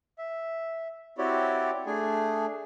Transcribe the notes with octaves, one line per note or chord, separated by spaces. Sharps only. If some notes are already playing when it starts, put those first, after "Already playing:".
E5
C4 E4 F#4 G4 C#5 D5
A3 D4 G#4 G#5